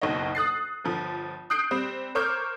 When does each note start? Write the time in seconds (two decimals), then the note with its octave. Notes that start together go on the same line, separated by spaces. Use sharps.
0.02 F#1 B1 D#3 C#5 D#5
0.35 D#6 F#6 A6 C7
0.84 G1 F3
1.50 D#6 F#6 G6 C7 D7
1.71 G3 C4
2.15 A#4 C5 C#5 D6 F6 G6